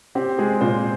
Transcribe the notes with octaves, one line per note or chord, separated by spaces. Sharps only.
C4 G4
G#3 G#4
A#2 C4 C5